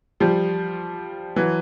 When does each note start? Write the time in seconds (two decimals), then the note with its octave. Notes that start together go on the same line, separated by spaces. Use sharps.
0.20 F3 G3
1.36 E3 F#3